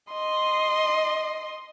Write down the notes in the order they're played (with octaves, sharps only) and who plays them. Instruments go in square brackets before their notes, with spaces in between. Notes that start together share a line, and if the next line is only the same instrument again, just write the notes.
[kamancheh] D#5 C6